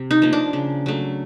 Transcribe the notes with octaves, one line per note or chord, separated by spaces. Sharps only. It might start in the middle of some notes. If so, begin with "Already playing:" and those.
Already playing: C3
D#4
F3 A#3
D4
C#3
F#3 A3